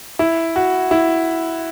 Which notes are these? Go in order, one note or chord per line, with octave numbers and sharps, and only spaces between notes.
E4
F#4
E4